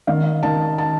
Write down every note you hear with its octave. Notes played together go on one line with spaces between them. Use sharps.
D#3 F5
D#3 A5
A5